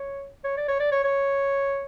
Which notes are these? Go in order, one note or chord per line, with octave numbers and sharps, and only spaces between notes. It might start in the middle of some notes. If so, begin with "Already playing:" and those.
Already playing: C#5
C#5
D5
C#5
D5
C#5
C#5